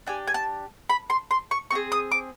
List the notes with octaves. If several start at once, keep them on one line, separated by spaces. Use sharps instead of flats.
D4 G4 G#5
G#5
A5
B5
C6
C6
C#6
C4 F4 G#4 C#6
D#6
D6